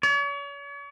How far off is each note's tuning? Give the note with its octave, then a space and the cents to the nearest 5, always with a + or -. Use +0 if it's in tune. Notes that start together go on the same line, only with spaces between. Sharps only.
C#5 +40